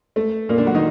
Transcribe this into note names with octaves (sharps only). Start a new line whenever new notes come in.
A3
A#2 A#3
D3 D4
F#3 F#4
D#3 D#4